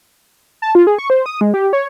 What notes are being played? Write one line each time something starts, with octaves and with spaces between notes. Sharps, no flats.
A5
F4
G#4
C#6
C5
D#6
G#3
G4
C#5